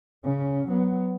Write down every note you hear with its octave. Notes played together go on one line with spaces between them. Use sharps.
C#3 C#4
F#3 B3